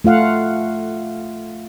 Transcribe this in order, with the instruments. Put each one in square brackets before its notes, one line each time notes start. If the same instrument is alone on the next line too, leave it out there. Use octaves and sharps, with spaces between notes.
[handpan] A3 F4 F5 F#5